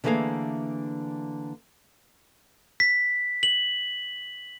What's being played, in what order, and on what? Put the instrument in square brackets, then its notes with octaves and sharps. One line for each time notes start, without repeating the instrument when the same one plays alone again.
[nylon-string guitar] D3 E3 A3 A#3 G#4 F5
[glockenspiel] B6
F#7